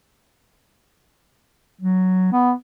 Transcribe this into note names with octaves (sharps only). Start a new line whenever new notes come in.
F#3
B3